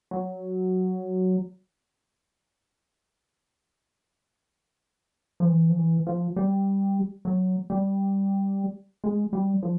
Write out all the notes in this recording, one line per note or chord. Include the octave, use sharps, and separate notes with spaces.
F#3
F3
E3
F3
E3
F3
G3
F#3
G3
G#3
G3
F3